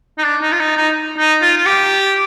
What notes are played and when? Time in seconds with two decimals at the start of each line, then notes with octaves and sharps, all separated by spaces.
0.18 D#4
0.24 D4
0.42 D#4
0.52 F4
0.60 D#4
0.77 D#4
1.18 D#4
1.42 F4
1.57 F4
1.66 G4